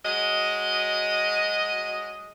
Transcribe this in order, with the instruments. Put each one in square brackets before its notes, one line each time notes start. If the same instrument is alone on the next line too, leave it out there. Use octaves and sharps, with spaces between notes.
[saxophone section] F#3 G#3 D#5